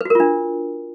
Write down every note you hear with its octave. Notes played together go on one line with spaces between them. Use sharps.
D4 F4 F#4 A#4 B4